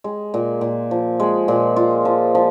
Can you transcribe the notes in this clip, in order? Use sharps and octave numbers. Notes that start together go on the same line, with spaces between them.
G#3
A#2
A#2
F3
G#3
A#2
F4
F3
F3